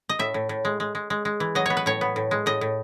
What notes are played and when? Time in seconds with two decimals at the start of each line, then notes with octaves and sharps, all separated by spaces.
0.09 D#5
0.19 A2 E5
0.34 A2
0.49 A2
0.65 G#3
0.80 G#3
0.95 G#3
1.10 G#3
1.25 G#3
1.40 E3
1.55 F#3 D#5
1.66 B3 C#5
1.77 B4
1.86 A2 C#5
2.01 B3
2.16 A2
2.31 G#3
2.46 A2 D#5
2.61 A2